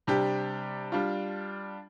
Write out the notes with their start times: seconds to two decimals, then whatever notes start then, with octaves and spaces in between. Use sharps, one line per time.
0.07 C3 G3 D4 G4
0.92 G3 D4 F4